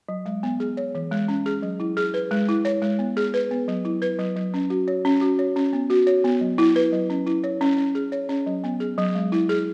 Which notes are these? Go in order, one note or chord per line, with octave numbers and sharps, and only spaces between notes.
F#3
G#3
B3
G#4
C#5
E3
G#3
C#4
G#4
F#3
E4
G#4
B4
G#3
E4
C#5
G#3
B3
G#4
B4
B3
F#3
E4
B4
F#3
F#3
C#4
F#4
C#5
C#4
F#4
C#5
C#4
B3
F#4
C#5
B3
F#3
E4
B4
F#3
C#4
E4
C#5
C#4
C#4
G#4
C#5
C#4
F#3
B3
G#4
F#3
G#3
E4
G#4